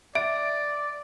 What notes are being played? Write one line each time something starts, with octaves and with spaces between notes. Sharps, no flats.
D5 E5 D7